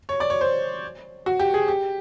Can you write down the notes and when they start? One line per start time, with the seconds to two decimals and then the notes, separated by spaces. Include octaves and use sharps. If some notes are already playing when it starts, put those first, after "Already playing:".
0.09 C#5
0.20 D5
0.30 C#5
0.41 C5
1.26 F#4
1.40 G4
1.54 G#4
1.68 G4